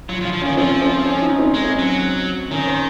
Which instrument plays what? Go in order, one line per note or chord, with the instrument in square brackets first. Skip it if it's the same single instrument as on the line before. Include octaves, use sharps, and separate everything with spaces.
[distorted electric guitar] F#3 [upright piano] F4
[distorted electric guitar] F3
[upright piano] F4
[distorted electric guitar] F3
[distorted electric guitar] D#3 [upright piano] C#4
[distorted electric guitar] F3 [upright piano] C4
[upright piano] C4
C#4
D#4
C4
[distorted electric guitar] G#3 [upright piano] C#4
[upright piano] C4
[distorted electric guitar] F#3
[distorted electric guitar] D#3 [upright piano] C#4
[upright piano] C5